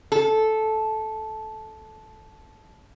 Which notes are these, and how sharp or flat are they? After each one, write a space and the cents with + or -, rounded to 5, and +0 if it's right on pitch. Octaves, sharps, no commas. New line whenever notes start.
A4 -10